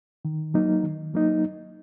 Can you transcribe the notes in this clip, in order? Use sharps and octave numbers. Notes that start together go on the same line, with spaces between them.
D#3
F#3 A#3 D#4
D#3
F#3 A#3 D#4